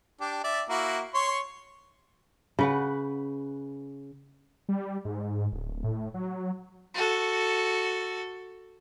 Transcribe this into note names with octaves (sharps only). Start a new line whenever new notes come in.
D4 G4
D5 E5
A#3 E4 F#4
C#5 C6 C#6
C#3 B4 F#5
G3
G#2
D1
A2
F#3
F#4 A4